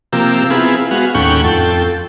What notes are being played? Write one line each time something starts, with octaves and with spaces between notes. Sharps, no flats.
C3 F3 A#3 G4 E6
B3 C4 E4 F4 G#4
G#3 B3 F#4 F5
D#2 A2 C#4 F#5 G5 C#6
F2 A4 G5